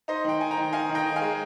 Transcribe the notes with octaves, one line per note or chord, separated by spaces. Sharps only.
D#4 C5 D#5
D#3 G5
D#4 G#5
G5 A#5
D#3
D#4 F5 G#5
D#3
D#5 G5
D#3
F5 G#5
G#3